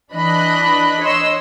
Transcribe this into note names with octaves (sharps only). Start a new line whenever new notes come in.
E3 D4 D#5 B5 F#6
C#5 D#5 C6 E6